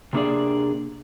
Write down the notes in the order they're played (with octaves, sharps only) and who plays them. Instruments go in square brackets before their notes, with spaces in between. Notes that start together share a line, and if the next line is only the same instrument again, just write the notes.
[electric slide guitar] C3 A#3 D4 G#4 D5